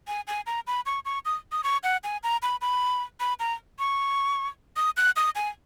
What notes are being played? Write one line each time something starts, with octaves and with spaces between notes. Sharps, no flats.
G#5
G#5
A#5
B5
C#6
C#6
D#6
D#6
C#6
F#5
G#5
A#5
B5
B5
B5
A#5
C#6
D#6
F#6
D#6
G#5